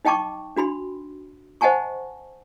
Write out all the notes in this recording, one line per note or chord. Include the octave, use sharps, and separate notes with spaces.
D#4 D#5 G5 A5 C#6 D6
D4 F#4 B5 C6
C5 D#5 F#5 G#5 A5 C#6